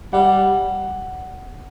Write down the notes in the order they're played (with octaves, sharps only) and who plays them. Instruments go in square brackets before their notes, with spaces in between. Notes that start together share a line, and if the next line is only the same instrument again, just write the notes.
[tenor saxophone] G3 [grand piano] F#5